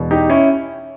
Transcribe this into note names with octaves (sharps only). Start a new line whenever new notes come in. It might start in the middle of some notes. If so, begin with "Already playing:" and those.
Already playing: E1 E2 B2
D#4 G4
C#4 E4